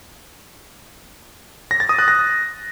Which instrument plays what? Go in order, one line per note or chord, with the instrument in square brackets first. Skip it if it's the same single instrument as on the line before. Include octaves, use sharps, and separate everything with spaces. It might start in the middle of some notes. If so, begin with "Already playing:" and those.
[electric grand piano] A#6
A6
D#6
F#6
A#6